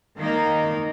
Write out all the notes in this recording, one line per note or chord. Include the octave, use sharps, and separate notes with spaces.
D#3 A#3 D#4